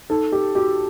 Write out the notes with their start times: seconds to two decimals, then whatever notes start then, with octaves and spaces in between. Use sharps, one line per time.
0.10 D#4 A4
0.32 G4
0.55 F#4 G4